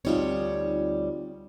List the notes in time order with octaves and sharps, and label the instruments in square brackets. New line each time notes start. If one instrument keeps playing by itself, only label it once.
[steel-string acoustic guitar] D2 G3 C#5 [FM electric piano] C4 D#4 F4